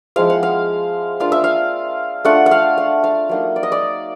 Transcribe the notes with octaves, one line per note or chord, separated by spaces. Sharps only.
F3 G#3 C4 E4 F5
F#5
F5
A#3 D4 F4 F5
E5
F5
A3 D4 F4 F#5
F#5
F5
F#5
F5
F#3 A#3 D#4
D5
D#5
D5